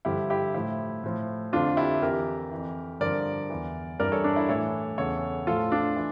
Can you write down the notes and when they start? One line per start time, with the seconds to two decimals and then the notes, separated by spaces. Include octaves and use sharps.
0.05 G2 D3 F3 E4 G4
0.30 E4 G4
0.54 A2 F3 E4
1.04 A2 F3
1.53 F2 D3 F3 D4 F4
1.77 E4 G4
2.02 F2 E3 G4 A#4
2.52 F2 E3
3.00 G2 D3 F3 A#4 D5
3.50 E2 E3
4.00 G2 E3 A#4 D5
4.12 A4 C#5
4.24 D4
4.36 E4
4.49 A2 E3 A4 C#5
4.98 E2 C#3 E3 A4 C#5
5.47 A2 F3 F4 A4
5.71 D4 F4
5.96 E3